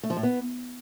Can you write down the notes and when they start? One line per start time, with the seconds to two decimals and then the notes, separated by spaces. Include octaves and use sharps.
0.03 A3
0.10 F3
0.17 A2
0.23 B3